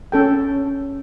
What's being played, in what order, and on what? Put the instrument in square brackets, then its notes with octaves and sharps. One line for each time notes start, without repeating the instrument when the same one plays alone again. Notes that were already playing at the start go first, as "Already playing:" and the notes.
[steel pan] C#4 A4 G5